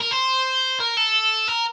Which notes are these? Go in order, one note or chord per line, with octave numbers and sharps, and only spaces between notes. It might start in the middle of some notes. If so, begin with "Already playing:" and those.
A#4
C5
A#4
A4
A#4